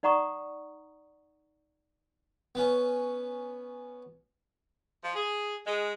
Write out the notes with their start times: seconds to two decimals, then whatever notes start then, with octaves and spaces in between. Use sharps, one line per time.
0.03 D#4 D5 F#5 A#5 C#6 D#6
2.55 B3 C#4
5.03 F3
5.15 G#4
5.66 G#3